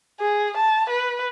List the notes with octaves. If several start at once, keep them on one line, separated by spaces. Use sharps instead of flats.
G#4
A5
B4